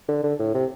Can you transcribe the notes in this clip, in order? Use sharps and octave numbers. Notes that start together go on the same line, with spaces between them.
D3
D3
A2
C3